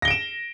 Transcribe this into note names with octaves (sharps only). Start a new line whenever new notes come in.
A#6 D7 E7 G7